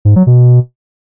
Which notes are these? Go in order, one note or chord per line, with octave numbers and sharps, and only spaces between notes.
G#2
F#3
B2